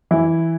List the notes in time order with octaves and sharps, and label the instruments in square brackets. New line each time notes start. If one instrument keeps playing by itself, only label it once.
[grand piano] E3 E4